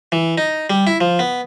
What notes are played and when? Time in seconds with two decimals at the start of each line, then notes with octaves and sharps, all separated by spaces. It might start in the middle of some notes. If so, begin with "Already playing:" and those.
0.12 E3
0.38 D#4
0.70 G3
0.87 E4
1.01 F3
1.19 B3